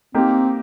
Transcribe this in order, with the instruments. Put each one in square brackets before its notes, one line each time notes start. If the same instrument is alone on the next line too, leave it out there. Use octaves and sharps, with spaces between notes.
[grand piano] A#3 D#4 G4 [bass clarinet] C4